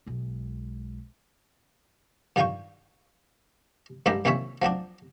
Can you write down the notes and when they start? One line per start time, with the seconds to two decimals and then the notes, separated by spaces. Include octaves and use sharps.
0.06 B1 G#3
2.36 G2 D#3 F4 F5 G5 C#6
4.06 A1 G2 G#3 E4 G4 A#4
4.25 C2 A#2 D#3 C#4 C#5 E5
4.62 F3 F#3 C4 D4